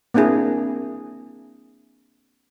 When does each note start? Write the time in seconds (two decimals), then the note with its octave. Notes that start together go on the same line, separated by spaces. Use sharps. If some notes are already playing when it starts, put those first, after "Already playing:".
0.14 A#3 C4 D4 E4 G#4